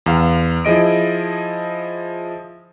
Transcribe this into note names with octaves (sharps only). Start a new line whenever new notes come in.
E2 F5
F3 E4 G#4 D#5 D7